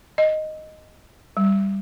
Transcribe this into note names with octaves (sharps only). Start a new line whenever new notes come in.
D#5
G3